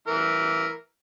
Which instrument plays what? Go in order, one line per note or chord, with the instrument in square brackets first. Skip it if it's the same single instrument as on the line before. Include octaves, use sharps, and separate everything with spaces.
[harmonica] E3 A#4